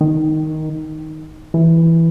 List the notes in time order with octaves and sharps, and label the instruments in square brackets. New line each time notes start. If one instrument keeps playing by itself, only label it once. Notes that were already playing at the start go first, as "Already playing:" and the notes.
[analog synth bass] D#3
E3